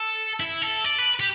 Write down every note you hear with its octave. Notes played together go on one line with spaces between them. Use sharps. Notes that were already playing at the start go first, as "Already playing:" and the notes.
Already playing: A4
E4
A4
D5
B4
G4